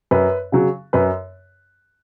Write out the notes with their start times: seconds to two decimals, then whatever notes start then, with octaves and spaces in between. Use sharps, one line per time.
0.11 F#2 B4
0.52 C#3 F#3
0.93 F#2 B4